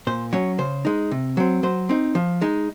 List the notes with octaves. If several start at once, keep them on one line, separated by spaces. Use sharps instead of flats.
A#2 C5
F#3 C#4 C#5
C#3 C5
G#3 D#4
C3
F#3 C4
F#3 C5
C4 D#4
F3
G#3 D#4